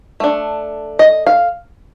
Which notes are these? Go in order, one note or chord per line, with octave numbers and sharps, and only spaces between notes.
A3 D4
D#5
F5